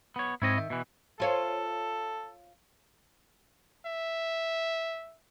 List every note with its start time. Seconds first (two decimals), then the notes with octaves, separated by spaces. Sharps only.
0.16 B3 C#5
0.42 G#2 C4 E4 C#5 D#5
0.58 D#3 E5
0.70 B2 E3
1.20 F4 A4 C#5 F5
3.86 E5